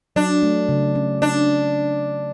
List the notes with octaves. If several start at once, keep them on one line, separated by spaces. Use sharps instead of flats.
F#3 D4
A3
C#3
C#4
C#4 D4